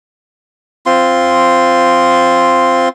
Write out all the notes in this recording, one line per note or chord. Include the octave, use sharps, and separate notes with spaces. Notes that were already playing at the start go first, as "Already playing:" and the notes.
C4 F4 C6